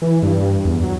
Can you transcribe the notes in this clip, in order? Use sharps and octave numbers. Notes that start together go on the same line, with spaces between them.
E3
G2
E2
F#3